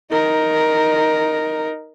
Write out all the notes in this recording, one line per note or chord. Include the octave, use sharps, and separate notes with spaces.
D#4 A#4